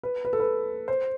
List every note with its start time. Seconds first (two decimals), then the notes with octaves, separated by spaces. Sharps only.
0.03 B4
0.25 B4
0.33 A4
0.40 B4
0.88 C5